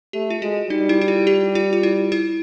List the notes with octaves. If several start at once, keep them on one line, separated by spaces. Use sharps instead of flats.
A3 G4
F4
G#3 F#4
G3 D#4
E4
E4
F4
G4
F4
F4
E4
E4